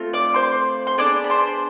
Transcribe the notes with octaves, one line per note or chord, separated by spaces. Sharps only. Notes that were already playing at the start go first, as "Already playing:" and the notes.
Already playing: A3 C4 F4
D5 D6
C5 C6
C6
B3 D4 G#4 D5 D6
B5
C5 C6